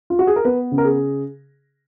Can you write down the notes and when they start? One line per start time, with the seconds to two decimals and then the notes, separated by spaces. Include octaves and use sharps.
0.10 F4
0.19 F#4
0.27 G#4
0.36 A#4
0.45 B3 B4
0.71 C#3
0.78 A#4
0.85 G#4